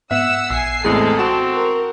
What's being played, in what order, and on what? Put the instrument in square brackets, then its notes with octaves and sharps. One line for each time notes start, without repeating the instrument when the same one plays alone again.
[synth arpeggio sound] G#2 B3 E7 [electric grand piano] E5 [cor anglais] F#5 [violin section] E6
[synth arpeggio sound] A#1 C#7 [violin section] G#5 C7 [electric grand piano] E6
[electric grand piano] E2 A2 C4 [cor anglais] G#3 [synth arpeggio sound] G#4 [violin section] A4
[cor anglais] C4 [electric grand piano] F#4 E7
[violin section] A#4